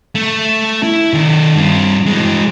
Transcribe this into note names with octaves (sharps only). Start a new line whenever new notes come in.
A3
E4 E5
D#3 A4
G2 C4
E3 G#3